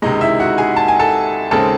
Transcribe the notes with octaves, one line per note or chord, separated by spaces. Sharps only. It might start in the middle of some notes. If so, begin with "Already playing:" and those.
C#2 C3 D#3 G#3 D#4 D#5
E4 E5
F#4 F#5
G#4 G#5
A5
G#5
A4 A5
D#2 C#3 G#3 C4 A4 A5